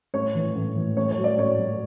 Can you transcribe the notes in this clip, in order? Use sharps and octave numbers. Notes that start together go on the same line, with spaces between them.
A2 C#5
E3
A2
E3
A2 C#5
C#5
F#3
D5
A2 C#5
F#3